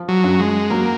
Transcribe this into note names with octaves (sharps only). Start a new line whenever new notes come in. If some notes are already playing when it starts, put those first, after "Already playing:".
Already playing: F3
F#3
F#2
G#3
F#3 A#3